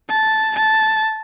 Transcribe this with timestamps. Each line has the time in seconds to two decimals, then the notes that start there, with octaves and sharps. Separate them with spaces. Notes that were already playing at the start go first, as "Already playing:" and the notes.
0.10 A5
0.57 A5